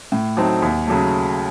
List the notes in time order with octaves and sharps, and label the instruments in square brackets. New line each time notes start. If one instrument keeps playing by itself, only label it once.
[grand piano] A2
F#3 A3 C4 D#4
D#2
C#3 F#3 A3